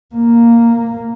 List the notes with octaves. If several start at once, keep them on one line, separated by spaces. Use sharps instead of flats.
A#3